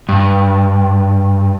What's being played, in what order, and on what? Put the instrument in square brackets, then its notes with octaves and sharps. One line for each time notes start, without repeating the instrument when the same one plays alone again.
[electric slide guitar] G2